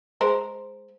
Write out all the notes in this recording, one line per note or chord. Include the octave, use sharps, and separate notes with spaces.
G#3 A#4 C5